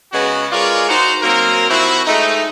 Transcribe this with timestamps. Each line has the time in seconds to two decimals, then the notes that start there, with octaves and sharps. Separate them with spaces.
0.13 C#3 G#3 B3 C#4 F#4
0.52 G#3 F4 A#4 C#5 D5
0.89 D#4 F#4 C5
1.22 F#3 A#3 C4 A#4
1.69 F3 C4 E4 F#4
2.06 G#3 A3 D#4